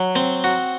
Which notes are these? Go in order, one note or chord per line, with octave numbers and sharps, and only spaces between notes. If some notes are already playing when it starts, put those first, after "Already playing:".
Already playing: F#3
C4
F#4